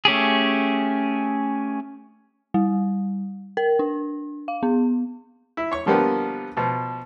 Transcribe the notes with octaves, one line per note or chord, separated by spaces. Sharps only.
A3 C#4 G4 G#4
G3
A#4
D4
F5
B3
E4
C#5 C#6
D3 F3 G3 A#3 B3
B2 F3